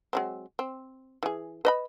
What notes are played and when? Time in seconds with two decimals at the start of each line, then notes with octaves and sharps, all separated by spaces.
0.13 F#3 G#3 C4
0.59 C4
1.23 E3 G#4
1.65 B4 D#5 B5